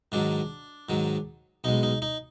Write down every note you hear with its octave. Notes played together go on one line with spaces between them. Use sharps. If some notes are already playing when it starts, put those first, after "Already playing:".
G#2 D#3 F#3 D4
G#2 D#3 F#3
B1 B2 G#3 D#4
D#4
D#4